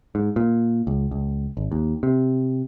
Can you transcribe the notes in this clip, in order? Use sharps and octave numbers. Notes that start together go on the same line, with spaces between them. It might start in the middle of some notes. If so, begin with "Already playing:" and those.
G#2
A#2
C#2
C#2
G#1
D#2
C3